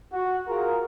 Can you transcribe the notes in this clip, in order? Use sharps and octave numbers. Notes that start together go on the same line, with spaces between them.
F#4
F4 G#4 A#4